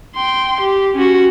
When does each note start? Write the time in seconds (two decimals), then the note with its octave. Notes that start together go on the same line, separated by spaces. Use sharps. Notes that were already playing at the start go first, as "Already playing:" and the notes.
0.15 G5 C6
0.61 G4
0.96 C#4 F#4